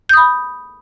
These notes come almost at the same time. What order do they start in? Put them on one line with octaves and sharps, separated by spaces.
G6 D#6 B5